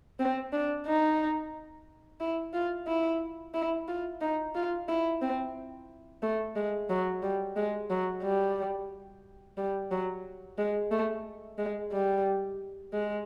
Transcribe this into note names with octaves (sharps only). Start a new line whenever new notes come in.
C4
D4
D#4
E4
F4
E4
E4
F4
D#4
F4
E4
C4
A3
G#3
F#3
G3
G#3
F#3
G3
G3
F#3
G#3
A3
G#3
G3
G#3